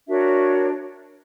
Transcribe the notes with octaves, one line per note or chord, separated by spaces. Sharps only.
D4 F#4 A#4 C#5 E5